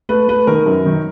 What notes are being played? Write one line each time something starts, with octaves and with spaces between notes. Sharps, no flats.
A3 B4
A3 B4
D#3 A#4
F#2
D#3